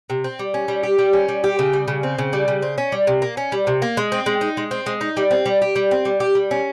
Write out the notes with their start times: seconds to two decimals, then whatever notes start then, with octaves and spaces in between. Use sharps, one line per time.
0.10 C3
0.24 C4
0.39 G3
0.54 C#4
0.68 G3
0.83 G4
0.99 G3
1.13 C#4
1.28 G3
1.44 G4
1.59 C#3
1.73 G3
1.88 C#3
2.03 C4
2.18 C#3
2.33 G3
2.48 C#3
2.62 C4
2.78 C#4
2.92 G3
3.07 C3
3.22 A#3
3.37 C#4
3.52 G3
3.67 C3
3.82 A#3
3.97 G#3
4.12 C4
4.26 G#3
4.41 D#4
4.57 G#3
4.71 C4
4.86 G#3
5.01 D#4
5.17 G3
5.31 C4
5.46 G3
5.62 G4
5.76 G3
5.91 C4
6.05 G3
6.20 G4
6.35 G3
6.51 C#4